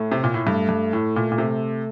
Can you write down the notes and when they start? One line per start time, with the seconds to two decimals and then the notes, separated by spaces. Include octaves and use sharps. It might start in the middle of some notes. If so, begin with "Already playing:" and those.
Already playing: A2 A3
0.12 C3
0.24 A#2
0.34 A2
0.46 G2 A3
0.69 G2
0.93 A2
1.16 A#2
1.32 A#2
1.38 C3